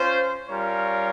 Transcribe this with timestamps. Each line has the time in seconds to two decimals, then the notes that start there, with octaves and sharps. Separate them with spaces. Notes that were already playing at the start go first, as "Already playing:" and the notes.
Already playing: C#4 F4 C5
0.49 G3 C#4 F4 A#4 C#5